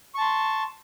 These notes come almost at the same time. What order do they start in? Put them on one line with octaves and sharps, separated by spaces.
C#6 A5 C6